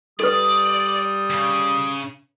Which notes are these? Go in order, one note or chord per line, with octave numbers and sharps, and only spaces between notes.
G3 A4 B4 D5 D#6
C#3